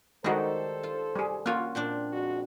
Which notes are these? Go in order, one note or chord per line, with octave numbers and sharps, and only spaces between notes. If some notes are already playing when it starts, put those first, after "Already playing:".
D#3 G3 G#3 D#4 F#4 A4 C5
F4
G3 G#4
A#3 C#4 F4 F#4
A#2 C4 D4
F2 G#3 F#4